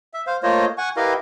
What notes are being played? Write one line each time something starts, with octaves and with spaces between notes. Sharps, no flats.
E5
C5 F5
A3 A#3 F4 C5 C#5 D#5
F#5 G#5 C#6
E4 G4 A#4 B4 D#5 F5